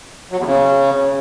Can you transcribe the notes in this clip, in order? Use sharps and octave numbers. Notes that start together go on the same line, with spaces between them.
F#3
E2
C#3